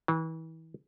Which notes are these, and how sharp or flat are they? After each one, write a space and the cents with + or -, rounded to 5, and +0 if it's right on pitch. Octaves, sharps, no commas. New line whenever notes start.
E3 -35